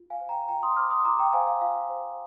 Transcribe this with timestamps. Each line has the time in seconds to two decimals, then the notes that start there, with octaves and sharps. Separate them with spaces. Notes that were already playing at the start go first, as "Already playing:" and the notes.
Already playing: F4
0.10 F5 G#5
0.20 C5
0.29 G5 A#5
0.48 F4 G5 A#5
0.63 C6 D#6
0.76 C5 D6 F6
0.90 C6 D#6
1.05 F4 A#5 D6
1.19 G5 A#5
1.33 C5 F5 G#5
1.47 F5
1.61 F4 F5
1.89 C5